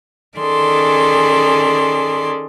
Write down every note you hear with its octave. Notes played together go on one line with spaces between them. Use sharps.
D#3 C#4 G#4 A4 D5 C6